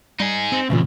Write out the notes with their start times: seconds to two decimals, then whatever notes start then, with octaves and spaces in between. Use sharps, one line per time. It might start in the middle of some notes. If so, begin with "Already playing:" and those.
0.19 G3 D#4 G#4 D7
0.52 C4 C#7
0.70 F2 A#2 C#3 E3 A3